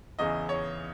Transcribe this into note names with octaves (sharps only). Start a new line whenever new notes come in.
E2 C#3 E3 D#5
C#5